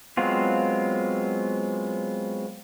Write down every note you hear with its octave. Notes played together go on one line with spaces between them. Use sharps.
F#3 G#3 B3 C4 F4